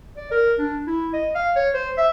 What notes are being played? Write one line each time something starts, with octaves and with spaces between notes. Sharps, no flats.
D5
A#4
D4
E4
D#5
F5
C#5
C5
E5